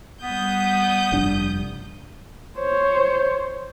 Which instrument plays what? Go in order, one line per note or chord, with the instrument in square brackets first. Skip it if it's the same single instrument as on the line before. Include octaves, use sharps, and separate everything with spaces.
[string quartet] G3 D#6 G6 [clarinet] B3
[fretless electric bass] F1 G2 D4
[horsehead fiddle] C5 C#5